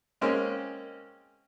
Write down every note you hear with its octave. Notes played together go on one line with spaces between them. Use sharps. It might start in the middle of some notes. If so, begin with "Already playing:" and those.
G#3 A#3 C4 C#4